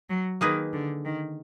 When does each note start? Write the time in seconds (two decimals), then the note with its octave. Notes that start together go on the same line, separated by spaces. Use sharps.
0.10 F#3
0.41 D#3 A#3 D#4 G#4 B4
0.73 D3
1.05 D#3